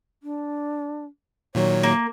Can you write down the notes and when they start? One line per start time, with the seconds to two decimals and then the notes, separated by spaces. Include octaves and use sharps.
0.23 D4
1.55 A#2 D#3 F#3 C#5
1.83 A#3